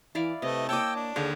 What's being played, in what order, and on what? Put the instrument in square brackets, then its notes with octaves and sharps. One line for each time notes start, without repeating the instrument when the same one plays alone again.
[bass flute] E3 [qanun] E4 D5 F5
[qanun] C3 [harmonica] A3 D#5 [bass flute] B4
[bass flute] A#3 [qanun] C#5 D#5 [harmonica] G5 E6 [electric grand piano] A5 D6
[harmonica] D4
[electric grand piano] D#2 [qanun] D3 F5 [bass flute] G#4